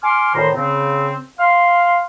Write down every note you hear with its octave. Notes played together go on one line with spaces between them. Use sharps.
G#5 C6 D6 F6
D2 A2 D#3 C5 A#5 C6
C#3 C4
F5 C6 F6